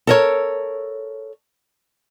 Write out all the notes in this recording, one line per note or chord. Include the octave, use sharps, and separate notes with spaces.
A4 A#4 C#5